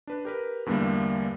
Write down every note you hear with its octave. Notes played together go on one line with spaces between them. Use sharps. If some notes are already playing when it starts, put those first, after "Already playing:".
D4 B4
G4 A#4 B4
E2 G2 D3 G3 A3 A#3